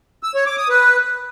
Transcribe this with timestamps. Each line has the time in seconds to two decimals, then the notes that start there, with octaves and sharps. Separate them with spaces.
0.23 E6
0.35 C#5
0.46 D6
0.58 D#6
0.69 B4